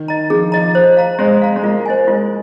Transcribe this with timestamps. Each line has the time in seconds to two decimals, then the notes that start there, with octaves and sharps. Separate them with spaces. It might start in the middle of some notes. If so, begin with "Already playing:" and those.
Already playing: D#3
0.08 D#5 A#5
0.30 F3 G#4
0.52 D#5 A#5
0.75 C5
0.97 F5 A#5
1.19 G#3 C5
1.42 F5 A#5
1.56 G#3
1.63 A#3 F4
1.86 C5 D#5 G#5
2.07 G#3 F4